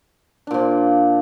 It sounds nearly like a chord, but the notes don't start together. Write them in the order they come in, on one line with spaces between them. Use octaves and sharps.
D4 A#2 F3